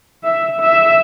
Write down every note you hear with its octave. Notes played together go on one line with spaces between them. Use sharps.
E5
E5